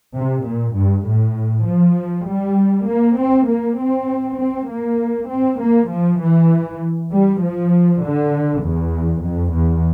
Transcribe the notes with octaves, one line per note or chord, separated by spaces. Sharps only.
C3
A#2
G2
A2
F3
G3
A#3
C4
A#3
C4
C4
A#3
C4
A#3
F3
E3
G3
F3
D3
E2
F2
E2